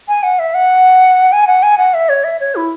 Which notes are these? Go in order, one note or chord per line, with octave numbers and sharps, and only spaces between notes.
G#5
F#5
E5
F#5
G#5
F#5
G#5
F#5
E5
C#5
E5
C#5
E4